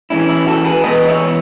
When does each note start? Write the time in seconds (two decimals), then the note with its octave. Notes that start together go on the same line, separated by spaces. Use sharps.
0.10 E3 G#3 C#4 E4
0.29 E4
0.47 F#4 A4
0.65 G#4 B4
0.84 E3 G#3 B3 B4 D#5
1.08 C#5 E5